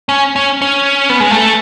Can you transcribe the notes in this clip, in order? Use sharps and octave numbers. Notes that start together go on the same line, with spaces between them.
C#4
C#4
C#4
B3
G#3
A3